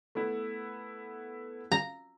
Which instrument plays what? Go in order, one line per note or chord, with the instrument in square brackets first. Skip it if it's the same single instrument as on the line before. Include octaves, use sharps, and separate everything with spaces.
[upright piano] A3 B3 E4
[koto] A#5